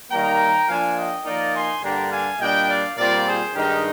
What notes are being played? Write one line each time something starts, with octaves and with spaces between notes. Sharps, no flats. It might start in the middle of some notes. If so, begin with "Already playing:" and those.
D#3 G3 A#3 G5 A#5
F3 A#3 D4 F4 F5 G#5
D#5 G5
F3 A#3 D#4 A#4 D5
G#5 C6
G2 D3 G3 A#3 D4 G5 A#5
F5 G#5
A#2 G3 D4 D#5 G5
D5 F5
A#2 G3 C4 F4 A#4 D5
G#4 C5
G2 D#3 G#3 D#4 G4 A#4